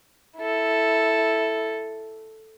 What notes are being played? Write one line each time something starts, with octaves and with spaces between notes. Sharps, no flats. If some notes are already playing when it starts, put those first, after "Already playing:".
E4 A4